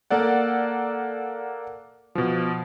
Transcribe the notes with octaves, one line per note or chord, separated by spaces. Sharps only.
A#3 A4 D5 F#5
B2 F3